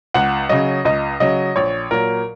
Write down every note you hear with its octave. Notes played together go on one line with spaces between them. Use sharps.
C#2 F#5
C#3 F#3 D#5
C#2 D#5
C#3 F#3 D#5
A#1 C#5
A#2 F#3 A#4